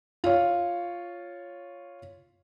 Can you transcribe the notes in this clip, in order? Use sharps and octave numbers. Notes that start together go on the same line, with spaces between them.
F4 C#5